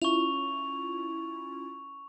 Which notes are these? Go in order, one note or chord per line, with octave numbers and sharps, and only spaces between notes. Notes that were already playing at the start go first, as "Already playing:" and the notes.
C#4 E4 F4 C#6 F7